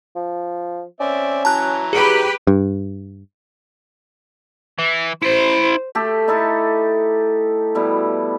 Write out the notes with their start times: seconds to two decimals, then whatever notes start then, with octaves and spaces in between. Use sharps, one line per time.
0.15 F3
1.00 C4 C#4 D5 E5
1.45 E3 F#3 A5 A#5 F#6
1.93 G4 G#4 B4
2.47 G2
4.79 E3
5.23 E4 C5 C6
5.95 A3 G4 A4
6.28 D#4 E4 A4
7.75 B2 G3 E4